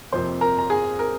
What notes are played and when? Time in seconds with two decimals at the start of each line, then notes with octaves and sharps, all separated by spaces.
0.12 F2 C3 F3 A#3 C5 C6
0.41 A#4 A#5
0.59 A#5
0.70 G#4 G#5
0.99 A#4